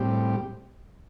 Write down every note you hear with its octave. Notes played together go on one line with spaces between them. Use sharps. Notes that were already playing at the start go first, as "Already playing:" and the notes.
Already playing: A2 G3 C4 G4